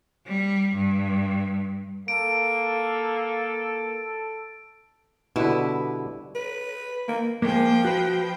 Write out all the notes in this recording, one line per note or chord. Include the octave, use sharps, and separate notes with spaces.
G3
G2
A#3 A4 D7
B2 D3 G3 E4 B4
B4
A#3
F3 G#3 A#3 G5
F#4 B4